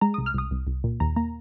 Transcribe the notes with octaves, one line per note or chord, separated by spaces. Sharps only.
G#3 A#5
D#6
C2
F6
C2 D#6
C2
C2
A#2
D#2 A#5
A#3 A#5